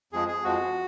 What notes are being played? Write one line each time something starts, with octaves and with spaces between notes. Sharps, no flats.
F2 F3 G#3 G#4
G#4
F2 F3 G#3 F#4